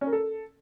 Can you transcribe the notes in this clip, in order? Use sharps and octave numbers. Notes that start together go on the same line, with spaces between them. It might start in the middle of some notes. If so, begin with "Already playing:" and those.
C#4
A#4
A4